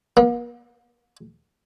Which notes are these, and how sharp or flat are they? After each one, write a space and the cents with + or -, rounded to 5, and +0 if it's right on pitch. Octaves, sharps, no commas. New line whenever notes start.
A#3 +45